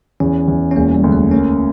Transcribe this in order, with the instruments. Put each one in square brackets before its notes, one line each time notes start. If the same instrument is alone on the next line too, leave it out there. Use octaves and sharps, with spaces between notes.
[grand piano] E2 [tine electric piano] C#4
[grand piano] E2
[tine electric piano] C#4
[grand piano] E1 [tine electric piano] A#3
[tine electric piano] G3
[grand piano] D2
[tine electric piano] A3
[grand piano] A#3 [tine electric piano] C#4